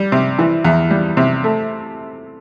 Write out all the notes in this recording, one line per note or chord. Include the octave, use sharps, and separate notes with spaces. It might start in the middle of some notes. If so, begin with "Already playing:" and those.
Already playing: G3
C3
E3
E2
G3
C3
A3